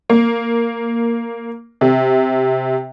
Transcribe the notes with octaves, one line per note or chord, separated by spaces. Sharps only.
A#3
C3